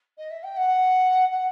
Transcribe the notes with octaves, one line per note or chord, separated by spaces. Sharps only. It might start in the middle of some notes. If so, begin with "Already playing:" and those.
D#5
E5
G5
F#5
F#5